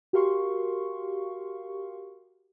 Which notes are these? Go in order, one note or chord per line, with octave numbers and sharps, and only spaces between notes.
F#4 G4 A#4 F5 C6 C#6